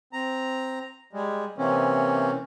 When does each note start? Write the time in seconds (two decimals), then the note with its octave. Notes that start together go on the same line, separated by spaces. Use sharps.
0.13 C4 A#5
1.13 G3 G#3
1.58 C3 E3 A#3 C4 C#4